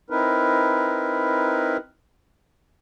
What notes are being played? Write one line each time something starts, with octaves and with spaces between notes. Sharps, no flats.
C4 D#4 E4 A#4 B4